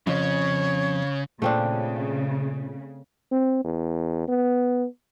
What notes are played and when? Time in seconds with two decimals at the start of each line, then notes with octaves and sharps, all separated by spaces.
0.07 F2 C#3 C#5
1.42 A#2 C#3 A3 C4 D4 F4
3.32 C4
3.65 E2
4.28 B3